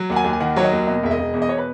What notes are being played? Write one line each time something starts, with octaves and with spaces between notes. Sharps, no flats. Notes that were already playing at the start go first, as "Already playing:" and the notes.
Already playing: F#3
D#2 F#5
G#5
D#2
G#5
D#3 F#5
F#3 C#5
D#5
D#2
B2 D#5
E1 E5
D#5
E1
E2
D#5
B2 C#5
B4